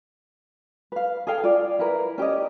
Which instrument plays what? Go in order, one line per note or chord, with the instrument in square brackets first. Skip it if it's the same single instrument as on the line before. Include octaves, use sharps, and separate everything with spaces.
[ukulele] B4 F5
G#4 A4 F5 G5
F4 D5
E4 A#4 B4
C#4 G4 D5 D#5